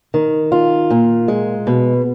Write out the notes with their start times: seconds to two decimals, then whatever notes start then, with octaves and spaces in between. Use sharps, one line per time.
0.14 D#3
0.52 F4
0.90 A#2
1.28 G#3
1.67 B2